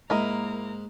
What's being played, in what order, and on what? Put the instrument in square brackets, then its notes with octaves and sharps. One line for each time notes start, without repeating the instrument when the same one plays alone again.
[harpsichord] G#2 [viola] A#3 A#5 [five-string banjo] E4 A#4 D#5